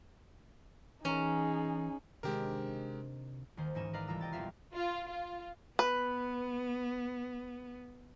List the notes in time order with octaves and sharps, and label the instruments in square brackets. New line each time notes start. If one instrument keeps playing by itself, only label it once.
[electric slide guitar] E3 A#5 [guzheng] C#4 [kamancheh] D#4 G#4
[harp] C3 D#3 D4 [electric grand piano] G#3 G4 A#4
[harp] D#2 D#3 C5
G#2 E3 C#4 D#4 G#5 E7
A#4 B4 D5 D#5 F5 A#5
C2 E3 F4 A4 A#5 E6
D#5 G5 A6
A#1 E2 F4 E5 F5 C6
[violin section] F4
F4
[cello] B3 [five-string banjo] B4